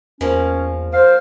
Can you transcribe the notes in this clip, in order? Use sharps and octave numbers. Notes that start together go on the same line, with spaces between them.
E2 F3 A#3 C#4
C5 F5